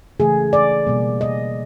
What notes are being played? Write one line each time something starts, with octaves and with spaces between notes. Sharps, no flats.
C#3 E3 A3 G#4
D5
B2 G3 A#3
D#5